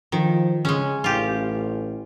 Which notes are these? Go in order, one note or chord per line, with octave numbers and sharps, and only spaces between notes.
D#3 F3
C#3 G#3 C#4
A1 F4 G4